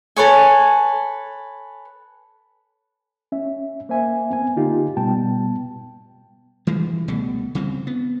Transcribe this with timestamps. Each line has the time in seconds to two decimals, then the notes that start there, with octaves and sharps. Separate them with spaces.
0.17 A4 B4 C#5 G#5
3.32 C#4 E5
3.89 A#3 C5 E5 G#5
4.31 B3 C4 G#5
4.56 D3 A#3 D#4 F4 G4
4.97 B2 G3 B3 G5 A5
6.67 E3 G3 G#3
7.08 C#2 B2 G3 A3
7.55 C#3 G3 C4
7.87 B3